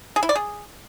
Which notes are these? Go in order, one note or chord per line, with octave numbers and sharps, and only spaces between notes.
G#4
E4
D5
G#4